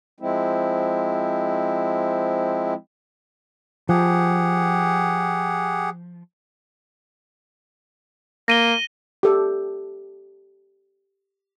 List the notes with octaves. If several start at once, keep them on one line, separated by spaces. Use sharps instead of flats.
F3 G#3 C4 E4
F3 G4 G#4 F#5
A#3 A#6 D#7 G7
G4 A4